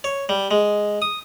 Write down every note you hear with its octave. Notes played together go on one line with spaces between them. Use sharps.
C#5
G3
G#3
D#6